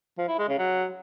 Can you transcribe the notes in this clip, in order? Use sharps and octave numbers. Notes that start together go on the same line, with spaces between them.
F3
E4
G#3
C#3
F#3